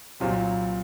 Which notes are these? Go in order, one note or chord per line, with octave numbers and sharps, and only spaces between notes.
C2 A#2 F#3 C4